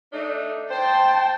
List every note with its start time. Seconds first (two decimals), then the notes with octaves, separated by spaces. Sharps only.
0.13 A3 D4 D#4
0.71 C5 G5 A5